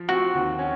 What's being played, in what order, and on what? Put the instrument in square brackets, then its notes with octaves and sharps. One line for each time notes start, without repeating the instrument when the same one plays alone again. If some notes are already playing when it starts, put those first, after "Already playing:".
Already playing: [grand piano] F3
[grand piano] C4 [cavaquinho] F#4
[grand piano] D#2
C#4